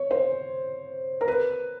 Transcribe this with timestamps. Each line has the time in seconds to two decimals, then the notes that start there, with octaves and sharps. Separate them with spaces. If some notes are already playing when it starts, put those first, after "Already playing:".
Already playing: C#5
0.11 C5
1.21 A#4
1.28 B4